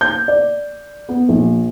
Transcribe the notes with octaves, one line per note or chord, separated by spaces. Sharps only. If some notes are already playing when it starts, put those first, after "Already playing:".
G6
D5
B3
A#1